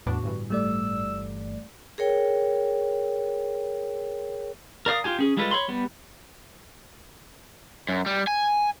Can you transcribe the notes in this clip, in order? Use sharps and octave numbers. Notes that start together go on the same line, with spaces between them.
E2 A2 B3 D4 F#4
G1 G2 E3
G3 A3 D5 E6
G#4 A#4 C#5 G5
A#4 D5 F5 D#6
F4 G4 G#5
C#4 G#4
G3 G#3 F4 A4 B4
C#5 B5 C6
G3 B3
F#2
G3
G#5